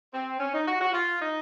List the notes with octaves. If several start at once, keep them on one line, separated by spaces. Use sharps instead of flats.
C4
C#4
D#4
F#4
F#4
F4
D#4